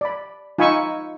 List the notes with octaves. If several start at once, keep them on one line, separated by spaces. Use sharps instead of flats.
D5 B5
D#4 F4 G#5 B5 C#6 E6